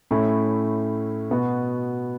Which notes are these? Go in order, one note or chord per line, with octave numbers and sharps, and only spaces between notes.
A2 A3 C#4 E4
B2 B3 F#4